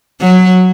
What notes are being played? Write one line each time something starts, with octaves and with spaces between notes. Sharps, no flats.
F#3